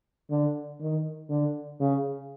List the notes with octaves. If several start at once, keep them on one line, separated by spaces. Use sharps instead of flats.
D3
D#3
D3
C#3